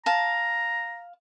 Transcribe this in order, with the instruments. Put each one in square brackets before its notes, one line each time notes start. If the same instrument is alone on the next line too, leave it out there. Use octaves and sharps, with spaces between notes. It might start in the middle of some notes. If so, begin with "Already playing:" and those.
[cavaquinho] F5 A5 [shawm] A#5